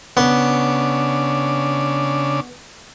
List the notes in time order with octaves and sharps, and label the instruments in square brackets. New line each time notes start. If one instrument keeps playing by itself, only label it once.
[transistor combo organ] C#3 D4 [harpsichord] B3